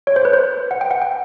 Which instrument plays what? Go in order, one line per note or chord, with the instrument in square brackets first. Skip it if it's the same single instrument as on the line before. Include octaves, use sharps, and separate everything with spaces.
[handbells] C#5
C5
B4
C5
F#5
G5
F#5
G5